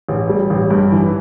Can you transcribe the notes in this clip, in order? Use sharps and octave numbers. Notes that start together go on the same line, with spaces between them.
A1
G3
A1
G2
E3